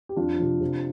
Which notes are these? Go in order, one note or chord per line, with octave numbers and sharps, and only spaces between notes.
G4
F2 D4 F4
C3 F3
C3